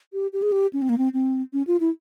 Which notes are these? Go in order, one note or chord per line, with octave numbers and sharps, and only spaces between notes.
G4
G4
G#4
G4
C#4
C4
A#3
C4
C4
C#4
F4
E4